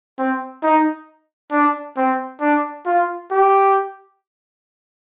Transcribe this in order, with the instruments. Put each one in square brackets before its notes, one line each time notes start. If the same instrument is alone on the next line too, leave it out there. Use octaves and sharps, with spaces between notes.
[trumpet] C4
D#4
D4
C4
D4
F4
G4